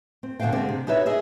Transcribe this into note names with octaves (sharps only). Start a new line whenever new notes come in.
C4
B2 D3 F#4 C5 F5 G5
B2 D3 G#3 C4 G4
C3
D#4 E4 G4 B4 C#5 E5
G#4 D#5 E5